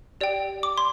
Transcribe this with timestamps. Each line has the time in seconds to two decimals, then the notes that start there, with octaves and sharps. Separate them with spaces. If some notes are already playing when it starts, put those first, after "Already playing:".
0.21 G4 D5 G5
0.63 D6
0.78 C6